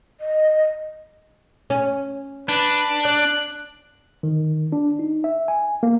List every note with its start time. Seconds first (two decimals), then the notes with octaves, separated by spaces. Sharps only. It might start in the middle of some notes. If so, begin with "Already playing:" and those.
0.20 D#5
1.70 C#4
2.49 D4 B4
3.05 D5 F#6
4.23 D#3
4.72 D4
4.99 D#4
5.24 E5
5.48 G#5
5.83 A#3